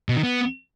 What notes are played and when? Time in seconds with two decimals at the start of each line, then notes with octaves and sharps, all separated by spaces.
0.09 B2
0.16 D#3
0.23 B3